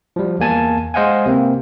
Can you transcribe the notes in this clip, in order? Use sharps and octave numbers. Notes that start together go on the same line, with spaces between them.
F3 G3
E2 A#3 G#5 A5
G#3 C5 D#5 F5 F#5 G#5
C3 A#3 C4